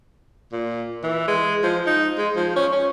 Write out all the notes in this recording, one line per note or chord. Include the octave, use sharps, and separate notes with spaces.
A#2
E3
G#3
F3
D#4
G#3
F3
C#4
C#4